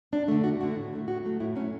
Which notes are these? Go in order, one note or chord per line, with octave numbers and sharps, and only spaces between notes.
F#2 D4
D3 A3
F#2 F#4
D3 A3 F#4
A2
F#3 A3
A2 F#4
F#3 A3
A2 E4
F#3 A3 C#4